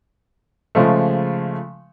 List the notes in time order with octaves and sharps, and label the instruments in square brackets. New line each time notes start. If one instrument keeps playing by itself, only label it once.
[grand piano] C#3 F3 G#3 A3